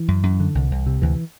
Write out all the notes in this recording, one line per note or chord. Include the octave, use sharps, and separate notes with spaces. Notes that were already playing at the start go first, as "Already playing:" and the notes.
Already playing: E3
F#2
F#2
D3
C2
C2
C3
D2 E3